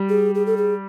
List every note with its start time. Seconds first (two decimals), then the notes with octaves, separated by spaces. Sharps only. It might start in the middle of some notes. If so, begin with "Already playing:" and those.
Already playing: G3
0.09 G#4
0.35 G#4
0.46 A4
0.57 G#4